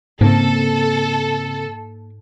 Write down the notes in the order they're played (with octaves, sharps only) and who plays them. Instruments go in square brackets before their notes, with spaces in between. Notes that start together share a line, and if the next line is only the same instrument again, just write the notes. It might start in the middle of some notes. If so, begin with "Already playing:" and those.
[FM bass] G#2 [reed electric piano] C#3 C4 [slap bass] A#3 [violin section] A4